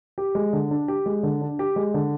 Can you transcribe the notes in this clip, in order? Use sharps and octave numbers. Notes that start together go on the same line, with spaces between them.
G4
G#3
D3
D4
G4
G#3
D3
D4
G4
G#3
D3